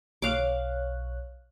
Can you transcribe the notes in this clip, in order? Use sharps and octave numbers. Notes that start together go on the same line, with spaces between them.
B1 C#5 F5 D6 F#6